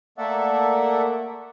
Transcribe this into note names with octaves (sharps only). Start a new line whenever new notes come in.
A3 A#3 A4 D5 E5 F#5